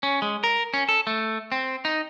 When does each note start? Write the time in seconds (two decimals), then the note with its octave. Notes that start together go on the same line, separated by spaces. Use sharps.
0.03 C#4
0.22 G#3
0.44 A#4
0.74 C#4
0.89 A4
1.07 A3
1.52 C4
1.85 D#4